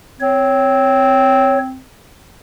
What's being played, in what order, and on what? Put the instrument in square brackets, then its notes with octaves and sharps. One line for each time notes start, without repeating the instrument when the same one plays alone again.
[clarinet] C4 [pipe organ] C#5